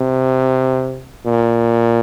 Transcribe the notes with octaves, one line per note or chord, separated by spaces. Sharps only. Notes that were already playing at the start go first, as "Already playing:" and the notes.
Already playing: C3
A#2